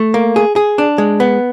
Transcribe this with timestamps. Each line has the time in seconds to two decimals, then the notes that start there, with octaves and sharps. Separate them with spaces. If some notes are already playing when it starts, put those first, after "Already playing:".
Already playing: A3
0.14 A#3
0.36 G#4
0.56 G#4
0.78 D4
0.98 G#3
1.20 B3